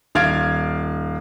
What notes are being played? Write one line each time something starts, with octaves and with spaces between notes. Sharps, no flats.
D#1 F5 F6 G#6 A6 D7